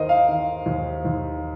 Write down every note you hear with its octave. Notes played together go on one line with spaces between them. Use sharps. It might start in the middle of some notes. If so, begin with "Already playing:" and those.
Already playing: D#2 D#3 A#4 C5 D#5
F5
D#3
D#2
D#2